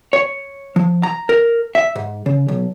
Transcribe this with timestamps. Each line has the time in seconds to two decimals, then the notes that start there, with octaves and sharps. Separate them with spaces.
0.13 C#5
0.76 F3
1.03 A#5
1.29 A#4
1.75 E5
1.96 G#2
2.26 C#3
2.48 B1